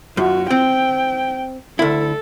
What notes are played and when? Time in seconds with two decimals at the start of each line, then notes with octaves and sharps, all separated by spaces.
0.17 F#2 F4 F#4
0.51 C4 G5
1.79 D2 E4 A4